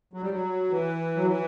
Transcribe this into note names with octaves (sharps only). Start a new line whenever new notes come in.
F#3
G3
F#3
E3
F#3
E3